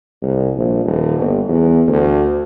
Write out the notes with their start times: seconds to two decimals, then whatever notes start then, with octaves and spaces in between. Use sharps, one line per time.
0.22 C2
0.56 A#1
0.85 D#1
1.20 G1
1.49 E2
1.87 D2